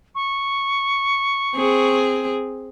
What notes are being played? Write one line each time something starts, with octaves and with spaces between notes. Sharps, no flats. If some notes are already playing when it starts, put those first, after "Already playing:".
C#6
C4 G#4